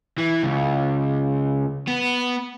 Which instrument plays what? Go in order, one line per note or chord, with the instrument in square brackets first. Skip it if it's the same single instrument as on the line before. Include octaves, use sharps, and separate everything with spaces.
[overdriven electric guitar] E3
C#2
B3